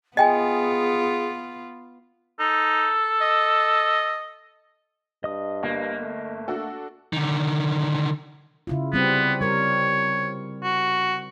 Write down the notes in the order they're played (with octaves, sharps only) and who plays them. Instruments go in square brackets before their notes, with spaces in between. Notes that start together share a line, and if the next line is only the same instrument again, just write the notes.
[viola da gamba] B3 F4 [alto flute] G#4 [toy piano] D#5 G5 G#5
[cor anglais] D#4 [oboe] A4
[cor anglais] D#5
[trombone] G2 [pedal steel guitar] D#5 D#6
[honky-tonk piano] G1 [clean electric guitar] A#3
[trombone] A3
[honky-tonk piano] D4 F#4 A4
[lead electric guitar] D3 D#3
[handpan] C#3 E4 F4
[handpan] G3 C4 [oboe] B3
[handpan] G3 A#4 [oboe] C#5
[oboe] F#4